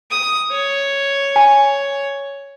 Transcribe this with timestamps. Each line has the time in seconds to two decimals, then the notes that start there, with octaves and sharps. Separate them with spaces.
0.11 D#6
0.52 C#5
1.36 G#5